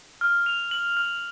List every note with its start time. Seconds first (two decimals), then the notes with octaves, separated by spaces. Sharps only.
0.21 F6
0.46 F7
0.71 F#7
0.97 F6